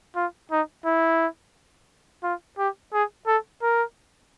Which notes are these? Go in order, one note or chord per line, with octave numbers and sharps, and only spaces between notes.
F4
D#4
E4
F4
G4
G#4
A4
A#4